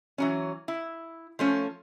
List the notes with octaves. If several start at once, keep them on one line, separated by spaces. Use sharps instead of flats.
E3 F#3 C#4
E4
F3 A3 C#4